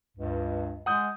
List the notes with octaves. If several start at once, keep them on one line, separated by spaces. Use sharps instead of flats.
C#2 G2
G#3 F#5 D#6 G6